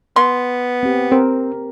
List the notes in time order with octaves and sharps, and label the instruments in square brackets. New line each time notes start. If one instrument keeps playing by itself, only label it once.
[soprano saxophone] B3 [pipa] C6
[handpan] C4 G4
[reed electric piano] C4 [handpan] A#4